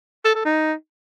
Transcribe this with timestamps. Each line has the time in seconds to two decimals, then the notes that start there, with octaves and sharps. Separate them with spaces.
0.25 A4
0.35 A4
0.45 D#4